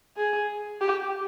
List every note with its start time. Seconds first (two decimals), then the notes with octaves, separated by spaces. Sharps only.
0.17 G#4
0.81 G4